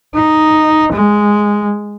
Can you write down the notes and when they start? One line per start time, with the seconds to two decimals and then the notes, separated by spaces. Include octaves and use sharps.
0.14 D#4
0.92 G#3